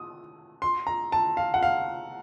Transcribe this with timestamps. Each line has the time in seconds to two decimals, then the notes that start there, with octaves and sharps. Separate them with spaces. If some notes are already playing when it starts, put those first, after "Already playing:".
Already playing: D#6
0.62 C6
0.87 A#5
1.12 A5
1.37 F5
1.54 F#5
1.63 F5